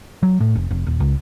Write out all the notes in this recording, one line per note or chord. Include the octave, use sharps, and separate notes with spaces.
F#3
A2
F1
F1
D#1
C#2